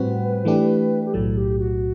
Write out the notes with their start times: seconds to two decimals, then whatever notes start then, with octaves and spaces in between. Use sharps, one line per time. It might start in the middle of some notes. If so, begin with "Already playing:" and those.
Already playing: A2 G3 C4 F#4 B4
0.45 E3 A3 D4 G4
1.05 G4
1.13 B1 A2 F#3 A4
1.37 G4
1.59 F#4